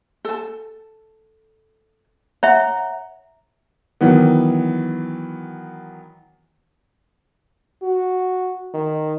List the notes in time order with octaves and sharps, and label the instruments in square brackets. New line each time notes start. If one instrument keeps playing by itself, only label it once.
[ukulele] A4 A5
[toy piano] C#5 E5 [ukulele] F#5 A#5
[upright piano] D#3 E3 F#3 B3
[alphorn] F#4
D#3